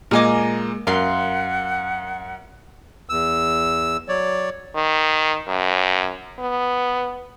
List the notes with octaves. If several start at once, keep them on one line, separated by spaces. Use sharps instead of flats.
A#2 G#3 A#3 A#4 D#5 G#5 D6
F#2 A#4 F5 F#5 C6
E2 E6
F#3 C#5 D5
D#3
F#2
B3